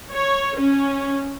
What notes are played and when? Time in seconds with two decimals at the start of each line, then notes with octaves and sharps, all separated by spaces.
0.14 C#5
0.58 C#4